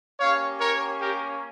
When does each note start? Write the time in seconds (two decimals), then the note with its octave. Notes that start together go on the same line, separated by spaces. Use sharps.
0.20 A#3 C#4 G4 C#5 F5
0.60 A#4 C#5
1.01 G4 A#4